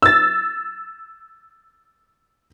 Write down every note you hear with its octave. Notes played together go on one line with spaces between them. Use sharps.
E6 A6